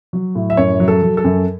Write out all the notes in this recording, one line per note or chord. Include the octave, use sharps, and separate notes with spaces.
F#3
A2
E5
F#2 C#5
F#3
A4
F#3
A4
F#2